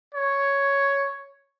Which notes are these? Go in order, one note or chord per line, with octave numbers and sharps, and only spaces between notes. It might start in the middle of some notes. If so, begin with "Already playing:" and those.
C#5